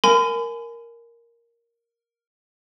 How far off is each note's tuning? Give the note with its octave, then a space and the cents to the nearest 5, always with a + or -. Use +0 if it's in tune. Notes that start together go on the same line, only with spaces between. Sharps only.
A#4 +0 G#5 +20 B5 +45